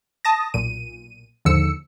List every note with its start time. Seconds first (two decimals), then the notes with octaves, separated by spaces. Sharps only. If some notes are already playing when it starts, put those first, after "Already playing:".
0.25 A5 D#6 A#6
0.54 B1 A#2 D#7
1.45 D#2 G#2 D3 F3 E6 C#7